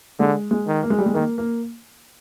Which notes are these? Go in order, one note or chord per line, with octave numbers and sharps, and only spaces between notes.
D3 G#3
G#3
D#3
A#3
G#3
G3
G#3
D#3 A#3
A#3